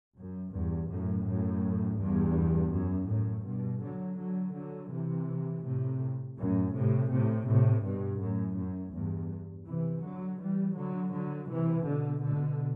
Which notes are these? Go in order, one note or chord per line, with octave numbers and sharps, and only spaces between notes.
F#2
E2 G2
F#2 A2
F#2 A2
E2 G2
F#2
F#2 A2
G2 B2
D3 F#3
D3 F#3
D3 F#3
C3 E3
A2 C3
F#2 A2
A2 C3
A2 C3
A2 C3
G2 B2
F#2 A2
F#2
E2 G2
C3 E3
D3 F#3
E3 G3
D3 F#3
D3 F#3
C3 E3
B2 D3
B2 D3